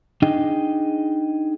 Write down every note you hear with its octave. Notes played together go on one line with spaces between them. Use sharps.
D4 D#4 G#4 D#5 G5